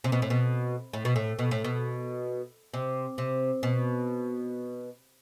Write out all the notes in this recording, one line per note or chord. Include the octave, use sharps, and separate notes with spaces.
C3
B2
A2
B2
A2
B2
A2
B2
A2
B2
C3
C3
B2